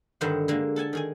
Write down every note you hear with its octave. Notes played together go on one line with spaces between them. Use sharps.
G2 D3 D#3 D#4 C5 F#5
D3 G#3 A#3
A4 F#5 G#5 A5
D#3 G#4 G#5